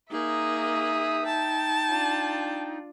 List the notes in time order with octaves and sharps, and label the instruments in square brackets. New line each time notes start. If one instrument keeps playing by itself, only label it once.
[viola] A#3 G#4 [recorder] D#4 [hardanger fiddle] E5 [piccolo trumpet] D#6
[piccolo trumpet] G5 [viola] A5
[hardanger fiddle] D4 F4